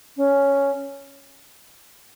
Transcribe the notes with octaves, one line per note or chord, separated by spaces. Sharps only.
C#4